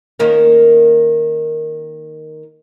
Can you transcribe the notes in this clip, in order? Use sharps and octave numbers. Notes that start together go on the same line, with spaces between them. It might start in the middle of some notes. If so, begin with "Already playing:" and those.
D#3 A#3 C#4